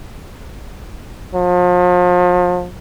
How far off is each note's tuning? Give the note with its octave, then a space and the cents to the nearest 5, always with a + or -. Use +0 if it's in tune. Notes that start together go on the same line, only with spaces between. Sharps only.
F3 +40